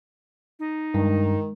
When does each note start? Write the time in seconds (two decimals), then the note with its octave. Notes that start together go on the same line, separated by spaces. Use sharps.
0.59 D#4
0.94 G2 D#3 G#3